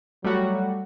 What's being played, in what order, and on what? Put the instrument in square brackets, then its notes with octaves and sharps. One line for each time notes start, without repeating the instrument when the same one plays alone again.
[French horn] F#3 [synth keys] G3 A3 F#4